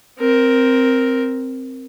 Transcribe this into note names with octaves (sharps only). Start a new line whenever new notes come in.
C4 A#4